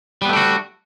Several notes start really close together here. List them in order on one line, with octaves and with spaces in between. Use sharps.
G3 B3 A3 D4 F#4